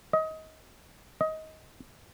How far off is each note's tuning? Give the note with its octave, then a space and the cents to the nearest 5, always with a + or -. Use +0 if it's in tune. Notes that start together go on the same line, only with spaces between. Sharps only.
D#5 +25
D#5 +20